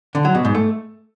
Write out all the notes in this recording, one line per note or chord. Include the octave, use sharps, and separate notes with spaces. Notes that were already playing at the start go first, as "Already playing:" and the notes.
D3
F#3
B2
G#2
A3